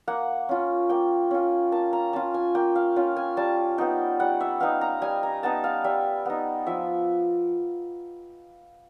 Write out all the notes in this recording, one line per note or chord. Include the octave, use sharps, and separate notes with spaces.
A#3 F#5
C#4 F4
A#3 G5
C#4 F4
A#3 A5
A#5
C#4 F4 A5
G#5
A#3 G5
F5
C#4 F4
G#5
G3 A5
B3 D#4 G5
G3 F#5
E5
B3 D#4 F5
A#5
G3 G#5
A#5
B3 D#4 A5
F5
G3 E5
B3 D#4
F3 E5